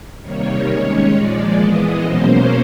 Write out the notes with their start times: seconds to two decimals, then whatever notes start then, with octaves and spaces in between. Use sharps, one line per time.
0.21 C3 D#3 G3 A#3 C#5
0.66 D#3 G#3 C#4
1.12 A#2 F3 G#3 D5
1.57 E3 G#3 B3 D#5
2.02 B2 F#3 A#3 C#4 C5